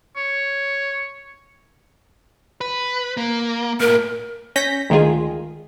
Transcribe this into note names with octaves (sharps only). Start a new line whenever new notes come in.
C#5
B4
A#3
A2 A#3 A#4
C#4 G6 A#6 B6
D2 D#3 G#3 F4 G#4